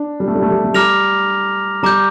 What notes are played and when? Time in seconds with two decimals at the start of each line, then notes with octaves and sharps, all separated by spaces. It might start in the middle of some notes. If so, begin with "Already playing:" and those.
Already playing: D4
0.20 G3
0.28 A3
0.35 G3
0.42 A3
0.51 G3
0.64 A3
0.74 G3 A#5 D6 F6 A#6 F7
1.83 G3 A#5 D6 G6